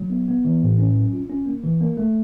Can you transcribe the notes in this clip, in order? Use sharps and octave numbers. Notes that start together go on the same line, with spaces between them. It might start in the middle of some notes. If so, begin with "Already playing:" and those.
Already playing: F#3
B3
B3
E3
A2
C#4
F#3
F4
C#4
A#3
E3
A#3
A3